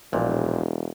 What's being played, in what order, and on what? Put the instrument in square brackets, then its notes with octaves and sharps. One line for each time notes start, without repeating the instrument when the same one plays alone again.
[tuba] E1 [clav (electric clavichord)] A#1 A#2